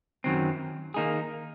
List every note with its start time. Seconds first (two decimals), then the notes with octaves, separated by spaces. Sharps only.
0.24 F#2 D#3 F#3 C4
0.94 D#3 A#3 D#4 G#4